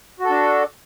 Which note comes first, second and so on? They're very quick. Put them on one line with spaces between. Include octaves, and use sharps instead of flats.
F#4 A4 D4